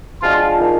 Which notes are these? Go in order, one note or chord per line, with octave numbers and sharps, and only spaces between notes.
F3 G#3 D4 F4 F#4
D#4 A#4 F5